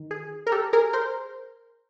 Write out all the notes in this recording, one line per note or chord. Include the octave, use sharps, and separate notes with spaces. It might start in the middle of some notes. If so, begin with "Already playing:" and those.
Already playing: D#3
G#4
A#4
G4 A4
G#4 A#4
A#4 C5